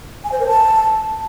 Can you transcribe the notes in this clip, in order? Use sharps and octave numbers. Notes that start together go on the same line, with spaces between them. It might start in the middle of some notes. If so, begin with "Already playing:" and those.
G#5
C5
A#4
A5